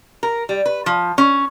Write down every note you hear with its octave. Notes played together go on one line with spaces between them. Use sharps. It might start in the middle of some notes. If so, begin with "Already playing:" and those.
A#4
G3
B4
F3
C#4